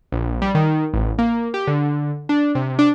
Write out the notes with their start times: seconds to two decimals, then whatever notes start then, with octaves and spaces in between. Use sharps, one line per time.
0.12 A#1
0.42 G3
0.55 D#3
0.94 A1
1.19 A#3
1.54 G4
1.67 D3
2.29 D4
2.55 C3
2.79 D4